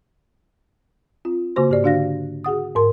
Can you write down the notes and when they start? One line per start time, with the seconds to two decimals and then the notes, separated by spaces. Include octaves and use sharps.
1.25 C4 F4
1.56 C#3 A#3 F#4 C5 C6
1.70 G#2 G4 D5
1.83 D3 D4 F#4 F5 F#6 A#6
2.44 F#4 G#4 F#5 D#6
2.76 G#2 A#4 C6